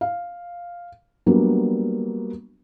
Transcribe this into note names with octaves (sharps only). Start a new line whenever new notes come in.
F5
F#3 G3 A#3 B3 D4